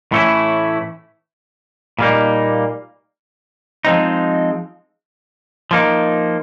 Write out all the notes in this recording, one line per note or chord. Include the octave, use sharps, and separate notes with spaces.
A2 E3 A3 C#4 E4
A#2 G3 A#3 D#4
F3 G#3 C4 D#4
F3 A#3 D#4